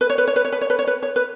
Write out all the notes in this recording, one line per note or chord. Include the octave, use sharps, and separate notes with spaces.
B4
C#5
B4
C#5
B4
C#5
B4
C#5
B4
C#5
B4
C#5
B4